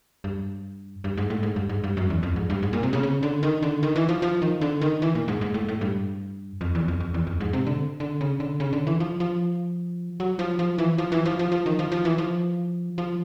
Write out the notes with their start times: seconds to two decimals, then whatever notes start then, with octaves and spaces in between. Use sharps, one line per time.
0.24 G2
1.04 G2
1.17 G#2
1.30 A2
1.43 G#2
1.56 G2
1.69 G#2
1.84 G2
1.97 F#2
2.10 E2
2.23 F2
2.36 G#2
2.50 G2
2.63 G#2
2.73 A#2
2.83 C3
2.93 C#3
3.03 C#3
3.23 D3
3.43 D#3
3.62 D3
3.83 D#3
3.96 E3
4.09 F3
4.22 F3
4.42 D#3
4.61 D3
4.81 D#3
5.02 E3
5.15 A#2
5.28 G#2
5.41 G#2
5.54 A2
5.68 A2
5.81 G2
6.61 F2
6.75 E2
6.88 F2
7.00 F2
7.14 E2
7.27 F2
7.40 G#2
7.53 C3
7.67 D3
8.00 D3
8.21 C#3
8.40 D3
8.60 C#3
8.73 D3
8.87 E3
9.00 F3
9.20 F3
10.20 F#3
10.39 F3
10.59 F3
10.78 E3
10.98 F3
11.12 E3
11.26 F3
11.39 F3
11.52 F3
11.66 D#3
11.79 F3
11.92 F3
12.05 E3
12.18 F3
12.98 F3